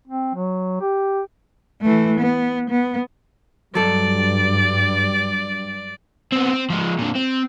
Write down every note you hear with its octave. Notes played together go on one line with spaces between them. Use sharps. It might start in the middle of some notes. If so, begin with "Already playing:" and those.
C4
F#3
G4
E3 A3
B3
B3
G2 F#3 A4 D5
B3 C4
C4
F3 G#3
A#2 D3
C4